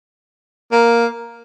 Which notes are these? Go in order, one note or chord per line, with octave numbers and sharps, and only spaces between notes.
A#3